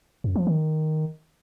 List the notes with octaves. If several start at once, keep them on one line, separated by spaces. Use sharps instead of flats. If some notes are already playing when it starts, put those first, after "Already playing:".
F#2
F3
D#3